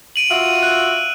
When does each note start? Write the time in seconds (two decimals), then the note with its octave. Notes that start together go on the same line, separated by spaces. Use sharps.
0.16 D7 D#7 F#7
0.30 F4 F#4 E5 E6 F#7
0.63 F#6